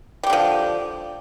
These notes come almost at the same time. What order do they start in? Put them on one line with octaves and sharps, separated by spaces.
G3 G4 D3 F3